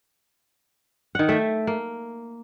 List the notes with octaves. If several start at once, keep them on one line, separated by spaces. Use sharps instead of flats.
D#3 F#5
A3 E5 G5
A#3